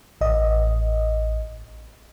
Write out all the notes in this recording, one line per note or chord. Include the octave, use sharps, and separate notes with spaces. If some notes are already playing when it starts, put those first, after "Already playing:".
A1 D#5